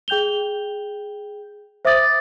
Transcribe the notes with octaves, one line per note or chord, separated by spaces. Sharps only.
G#4 G5 G6 F7 G7
C5 E5 D6 D#6 A6